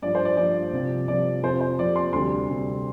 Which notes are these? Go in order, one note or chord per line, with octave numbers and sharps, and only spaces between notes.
G2 F3 D5
C5
D5
G2 F3 D5
C2 C3 F3
C2 C3 F3 D5
F2 C3 F3 C5
C5
F2 C3 F3 D5
C6
D2 C3 G3 C6
D2 C3 G3